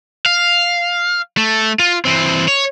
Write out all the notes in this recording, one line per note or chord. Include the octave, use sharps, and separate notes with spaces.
F5
A3
F4
E3 C4
C#5